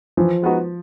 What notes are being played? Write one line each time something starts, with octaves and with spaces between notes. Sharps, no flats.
E3 F3
G#3 B3 D#4 F#4